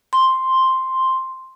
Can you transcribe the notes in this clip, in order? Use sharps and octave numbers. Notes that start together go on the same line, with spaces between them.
C6